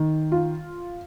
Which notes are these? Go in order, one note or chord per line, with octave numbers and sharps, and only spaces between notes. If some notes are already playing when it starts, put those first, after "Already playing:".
Already playing: D#3
F4